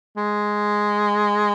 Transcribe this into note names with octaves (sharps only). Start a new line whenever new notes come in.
G#3